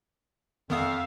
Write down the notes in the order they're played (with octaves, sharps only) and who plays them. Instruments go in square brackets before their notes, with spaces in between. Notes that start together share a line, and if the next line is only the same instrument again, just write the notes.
[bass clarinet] F2 [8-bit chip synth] D#3 B3 D#6 [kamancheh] E5 F5